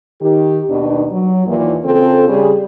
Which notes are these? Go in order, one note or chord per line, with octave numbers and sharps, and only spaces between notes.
D#3 G4
D#2 B2 D#3 B3 D4 D#4
F#3
D#2 A#2 E3
C#3 C4 F4 A4
C#3 G3 G#4